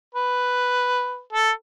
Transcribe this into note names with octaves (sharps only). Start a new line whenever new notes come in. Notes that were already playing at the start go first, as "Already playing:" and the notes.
B4
A4